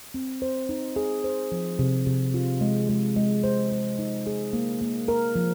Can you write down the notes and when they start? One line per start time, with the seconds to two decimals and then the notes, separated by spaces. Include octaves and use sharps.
0.14 C4
0.42 C5
0.69 D#4
0.96 G#4
1.24 C5
1.52 F3
1.79 C3
2.06 C3
2.34 F4
2.61 G#3
2.89 G#3
3.16 G#3
3.44 C5
3.71 C5
3.99 D#4
4.27 G#4
4.53 A#3
4.81 A#3
5.08 A#4
5.36 F3